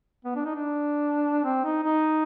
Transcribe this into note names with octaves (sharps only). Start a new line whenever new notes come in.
B3
D4
D#4
D4
C4
D#4
D#4